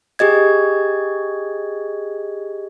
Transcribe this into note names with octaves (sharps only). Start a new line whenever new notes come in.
G4 G#4 D#5 G#6